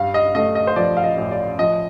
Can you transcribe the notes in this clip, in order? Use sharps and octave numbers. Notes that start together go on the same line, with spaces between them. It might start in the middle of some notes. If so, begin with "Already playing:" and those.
Already playing: G2 F5
D#5
A3 D#5
D#5
C5
F3 D5
F5
D#5
A1
D5
F3 D#5